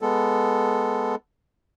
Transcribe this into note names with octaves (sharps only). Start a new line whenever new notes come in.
G#3 B3 A4